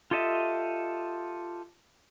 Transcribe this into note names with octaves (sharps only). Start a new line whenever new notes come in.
F4 G4 A4 D#5 E5